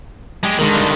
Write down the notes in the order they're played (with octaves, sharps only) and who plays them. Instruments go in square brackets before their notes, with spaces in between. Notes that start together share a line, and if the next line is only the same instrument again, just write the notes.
[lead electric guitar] G#3 G4
[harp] G#2 A#4 [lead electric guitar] D3 D#3
[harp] G2 F6